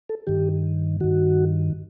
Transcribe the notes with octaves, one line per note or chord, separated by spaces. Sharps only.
A4
G2 D#3 G4
G2 D#3 F#4